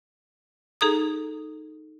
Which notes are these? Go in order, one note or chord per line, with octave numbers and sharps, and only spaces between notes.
D#4 G#4 A4 A#5 D#6